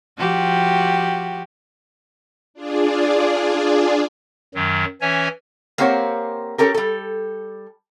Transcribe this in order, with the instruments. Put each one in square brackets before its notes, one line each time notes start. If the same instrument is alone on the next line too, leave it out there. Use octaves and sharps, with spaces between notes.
[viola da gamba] F3 F#4 G4
[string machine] D4 F4 G#4 D5
[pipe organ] F#2 D#3 F#3
E3 C#4 C#5 E5 G#5
[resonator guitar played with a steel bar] A#3 C4 G4 C5 C#5 F#5
C#4 G4 A4 A#4
G3 A4